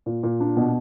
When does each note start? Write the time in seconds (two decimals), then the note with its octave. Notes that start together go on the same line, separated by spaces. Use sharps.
0.06 A#2
0.23 A#2
0.40 D4
0.57 B2